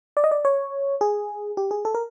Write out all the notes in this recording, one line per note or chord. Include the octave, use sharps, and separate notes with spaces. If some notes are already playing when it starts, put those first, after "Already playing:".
D5
D#5
D5
C#5
G#4
G4
G#4
A4
A#4